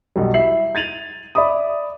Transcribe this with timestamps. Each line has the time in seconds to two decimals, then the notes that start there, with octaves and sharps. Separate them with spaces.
0.16 B1 F#3 G3
0.34 E4 E5 C7 F#7
0.75 G#6 A6 D#7 F7 F#7
1.35 D5 E5 B5 D6 D#6